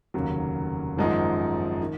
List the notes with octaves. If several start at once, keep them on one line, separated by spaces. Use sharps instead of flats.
F1 D#2 C#3 F#3 A#3
G#1 F#2 F3 G#3 D#4
D#3